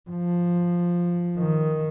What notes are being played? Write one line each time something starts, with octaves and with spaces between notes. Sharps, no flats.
F3
D#3